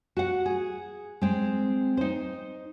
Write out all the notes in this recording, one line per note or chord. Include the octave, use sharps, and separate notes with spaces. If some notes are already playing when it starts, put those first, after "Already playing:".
F#4 F#5
G#4
G#3 C4
D#4 C5